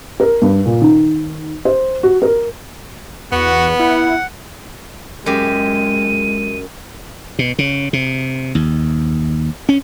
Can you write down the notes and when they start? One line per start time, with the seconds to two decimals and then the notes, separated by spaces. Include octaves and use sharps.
0.20 A#4
0.42 G2
0.66 A#2
0.82 D#3
1.65 C5
2.03 F#4
2.22 A#4
3.32 E2 B3 F#4
3.80 E4 F#5
5.26 F#2 G#3 G4 D#7
7.39 B2
7.59 C#3
7.93 C3
8.55 D#2
9.69 C#4